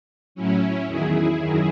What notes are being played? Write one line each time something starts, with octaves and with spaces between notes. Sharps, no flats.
A2 F#3 C#4 E4
E2 D#3 F#3 E4 G#4
F#2 D#3 F#3 E4 G#4